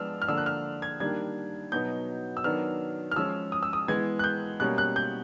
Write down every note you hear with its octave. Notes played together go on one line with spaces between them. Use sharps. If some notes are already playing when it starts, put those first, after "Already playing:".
Already playing: F3 G#3 B3 D4 E6 F6
F6
D3 F3 A#3 D4 E6
F#6
F6
G#6
D#3 G3 A#3 D4 G#6
B2 F#3 B3 D#4 G6
E6
D#3 F#3 B3 D4 F6
F6
F3 G#3 C#4 E6
D#6
E6
D#6
E3 G#3 B3 G#6
F#6
G6
B2 G3 A#3 C#4 F#6
F#6
G6